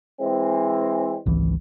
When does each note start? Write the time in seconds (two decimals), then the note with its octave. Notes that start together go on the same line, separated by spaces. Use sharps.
0.21 E3 G#3 C4
1.26 G#1 C#2 E3